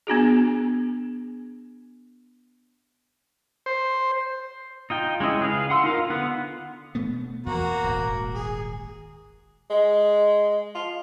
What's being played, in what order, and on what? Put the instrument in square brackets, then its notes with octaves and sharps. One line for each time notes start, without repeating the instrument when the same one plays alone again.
[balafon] B3 D4 F#4 G#4
[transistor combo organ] C5
[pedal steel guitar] D#4 F4 G5
G#3 C#4 E4 D#5
C#3 G#4 B4 F5
F#5 C6 E6
D#4 F4 A#4 F5
D3 B3 F#5
[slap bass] B2 A3 B3
[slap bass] E2 [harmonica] A#3 F#4 A#5
[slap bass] D#1 G#1
[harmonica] G#4
[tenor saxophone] G#3
F4